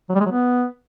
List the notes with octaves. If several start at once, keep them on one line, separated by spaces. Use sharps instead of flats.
F#3
G3
G#3
F#3
B3